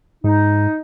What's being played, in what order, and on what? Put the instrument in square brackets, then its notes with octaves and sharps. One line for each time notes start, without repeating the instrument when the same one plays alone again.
[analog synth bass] G#2 [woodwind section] D#4